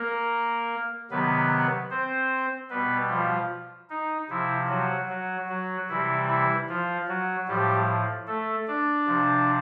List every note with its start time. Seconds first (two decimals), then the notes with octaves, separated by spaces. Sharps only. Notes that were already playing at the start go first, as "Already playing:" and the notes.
Already playing: A#3 A#4
1.11 C3 D#3 F#3 B3 B4
1.90 C4 C5
2.70 B2 G3 B3 B4
3.10 F3 F4
3.90 D#4
4.29 C3 F3 E4
4.69 F#3 F#4
5.09 F#3 F#4
5.49 F#3 F#4
5.89 C3 E3 G3 E4
6.28 E4
6.69 F3 F4
7.08 F#3 F#4
7.48 A2 F3 G3 G4
8.27 A3 A4
8.68 D4 D5
9.07 C3 F3